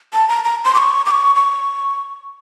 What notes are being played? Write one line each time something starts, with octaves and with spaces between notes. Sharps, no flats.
A5
A#5
A#5
C6
D6
C#6
D6
C#6
C#6